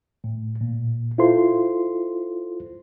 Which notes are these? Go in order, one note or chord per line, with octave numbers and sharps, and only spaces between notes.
A2
A#2
E4 F4 A4 C5 C6